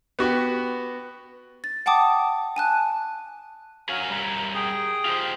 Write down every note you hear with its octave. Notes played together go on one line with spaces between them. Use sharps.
B3 F#4 G4
A6
F#5 G5 A5 D6 D#6
G#5 A5 F#6
F#3 A#4 C#5 F5 G#5
G3 A#4 C#5 B5
B5
G#4 G5 D#6
F4 G4 C5